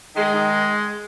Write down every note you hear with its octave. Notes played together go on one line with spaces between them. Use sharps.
D#3 G#3
D#3